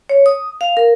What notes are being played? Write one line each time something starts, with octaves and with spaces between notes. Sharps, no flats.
C#5
D#6
F5
A#4